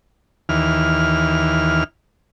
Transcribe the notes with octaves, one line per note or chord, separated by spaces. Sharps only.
D#2 E3 F6